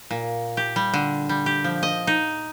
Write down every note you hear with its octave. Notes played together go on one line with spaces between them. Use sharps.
A#2
G4
G3
D3
G3
G4
F3
D#5
D#4